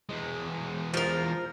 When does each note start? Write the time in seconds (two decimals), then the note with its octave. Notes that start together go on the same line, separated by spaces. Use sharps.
0.09 E2 G#3
0.94 F3 A#4